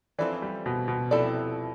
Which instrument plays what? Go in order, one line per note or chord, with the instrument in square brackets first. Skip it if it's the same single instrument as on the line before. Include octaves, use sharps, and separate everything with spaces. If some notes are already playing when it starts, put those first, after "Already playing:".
[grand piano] E3 [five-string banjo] F3 C4 E4 A4 D5
[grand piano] G3
B2
B2
[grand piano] C3 [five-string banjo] F3 C4 E4 A4 D5